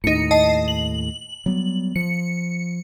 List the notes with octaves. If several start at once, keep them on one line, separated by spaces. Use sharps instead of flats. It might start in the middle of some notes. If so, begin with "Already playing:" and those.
D#2 A2 D#4 C#7
D#5 A5 C7
F#7
F#3 G3 B3
F3 C#7